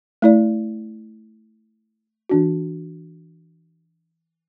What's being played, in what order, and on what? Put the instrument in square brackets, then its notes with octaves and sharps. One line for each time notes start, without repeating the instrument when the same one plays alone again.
[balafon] A3 E4 D5
E3 D4 F#4